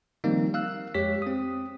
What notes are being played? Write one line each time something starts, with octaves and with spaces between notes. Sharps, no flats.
D#3 F3 G3 A#3 C4 D#4
F5 E6 F#6
F2 G#3 G4 C#5 B6
C4 D#6